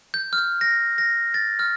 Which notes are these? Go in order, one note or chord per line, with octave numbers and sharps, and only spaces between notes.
G6
F6
G6
A#6
A#6
A6
F6